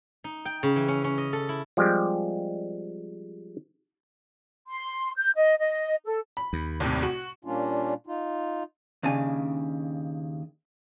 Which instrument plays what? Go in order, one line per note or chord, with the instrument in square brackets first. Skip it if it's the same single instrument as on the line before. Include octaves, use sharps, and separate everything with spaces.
[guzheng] D#4
G5
C#3
E3
C#4
C#4
D#5
A4
E4
[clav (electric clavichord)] F3 G3 G#3 C4 G4
[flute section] C6
G6
D#5
D#5
A4
[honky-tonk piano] B5
[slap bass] D#2
[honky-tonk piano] C2 A2 C3
F#4
[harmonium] A#2 G3 A#3 C#4 D4 F4
D#4 F4
[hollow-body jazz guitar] D#2 C#3 D4 G#5